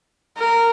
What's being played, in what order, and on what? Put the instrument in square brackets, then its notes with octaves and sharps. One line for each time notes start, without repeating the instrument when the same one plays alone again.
[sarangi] A#4